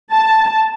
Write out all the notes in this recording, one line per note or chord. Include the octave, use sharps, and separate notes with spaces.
A5